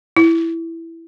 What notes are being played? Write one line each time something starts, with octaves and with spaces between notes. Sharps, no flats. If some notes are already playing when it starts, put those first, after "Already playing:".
E4